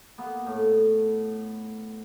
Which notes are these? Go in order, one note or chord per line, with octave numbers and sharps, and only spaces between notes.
A#3 B3
A2